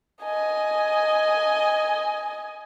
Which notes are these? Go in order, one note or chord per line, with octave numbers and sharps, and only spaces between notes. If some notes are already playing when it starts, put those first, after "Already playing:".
D#5 G#5